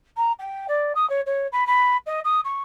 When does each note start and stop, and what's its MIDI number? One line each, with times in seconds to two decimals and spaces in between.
0.17 0.32 82
0.39 0.66 79
0.68 0.92 74
0.95 1.08 87
1.09 1.21 73
1.26 1.47 73
1.52 1.66 83
1.67 1.97 83
2.06 2.20 75
2.24 2.40 87
2.44 2.63 85